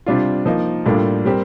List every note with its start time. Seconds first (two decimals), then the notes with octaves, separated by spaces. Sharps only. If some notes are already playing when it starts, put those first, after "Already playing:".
0.06 C3 G3 D4 F4
0.46 F3 A#3 D#4 A#4
0.86 A2 G3 A#3 D4 F4
1.25 G3 C4 G4 A#4